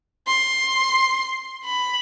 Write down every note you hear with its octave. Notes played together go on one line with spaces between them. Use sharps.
C6
B5